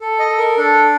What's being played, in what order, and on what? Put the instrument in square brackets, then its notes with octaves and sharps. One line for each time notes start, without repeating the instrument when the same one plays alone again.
[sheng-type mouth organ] A4
D#5
A4
A#4
D4 A4